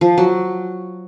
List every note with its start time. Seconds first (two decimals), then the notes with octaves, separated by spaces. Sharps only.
0.01 F3
0.18 F#3